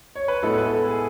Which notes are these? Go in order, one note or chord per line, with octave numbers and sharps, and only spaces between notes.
C#5
B4
A2 G#3 B3 E4 A4
B4
A4
G#4